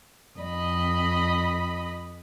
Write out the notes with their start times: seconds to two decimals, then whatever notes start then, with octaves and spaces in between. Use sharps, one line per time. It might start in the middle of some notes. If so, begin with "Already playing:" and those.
0.41 F2 D#5 B5